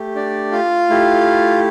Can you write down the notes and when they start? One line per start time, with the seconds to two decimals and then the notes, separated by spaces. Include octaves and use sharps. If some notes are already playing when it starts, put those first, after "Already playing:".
Already playing: A3 G4
0.15 D4 D5
0.52 F4 F5
0.90 A3 E4 G4